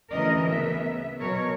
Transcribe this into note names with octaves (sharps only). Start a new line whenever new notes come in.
D2 E3 C#4 A#4 D#5
C#3 B3 E5
B2 F#3 A#4 C#5